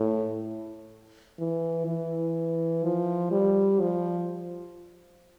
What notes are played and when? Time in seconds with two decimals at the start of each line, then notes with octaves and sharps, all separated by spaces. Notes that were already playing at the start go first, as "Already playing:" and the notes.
Already playing: A2
1.39 E3
1.86 E3
2.84 F3
3.31 G3
3.80 F3